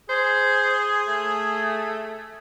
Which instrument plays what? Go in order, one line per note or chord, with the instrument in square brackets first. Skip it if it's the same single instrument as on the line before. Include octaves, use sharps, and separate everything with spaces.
[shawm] G#4 [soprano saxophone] C5
[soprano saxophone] A3